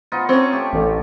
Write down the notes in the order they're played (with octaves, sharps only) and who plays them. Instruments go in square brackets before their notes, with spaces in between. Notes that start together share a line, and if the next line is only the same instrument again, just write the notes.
[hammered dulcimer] B3 D#4 F4
[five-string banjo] C4 C#4 [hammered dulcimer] C#5
[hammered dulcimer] A3 G4
[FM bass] A1